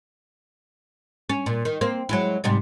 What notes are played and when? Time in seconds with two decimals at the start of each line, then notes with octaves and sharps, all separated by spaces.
1.29 C#4
1.46 A#2
1.65 D#3
1.81 A#3 C4
2.09 F#3 G#3 E4
2.44 G#2 C3 G3